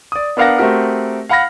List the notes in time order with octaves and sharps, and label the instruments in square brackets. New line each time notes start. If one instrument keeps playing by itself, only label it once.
[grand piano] D5 D#6
B3 D4 A#4 F5 F#5 A#6
A3 C4 F#4 G4 A#4
F5 F#5 B5 F6 A#6